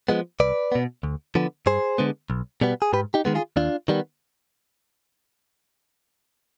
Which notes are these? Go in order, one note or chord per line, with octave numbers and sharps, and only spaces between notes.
F3 G#3 B3
C2 B4 D5
B2 B3
D2
D3 F3 B3
G2 G#4 C5
D3 G#3 B3
B1
B2 G3 B3
G#4
G#2 G4 B4
D#4 G4
D#3 G#3 B3
F4 G#4
D#2 D4 F4
D#3 G3 B3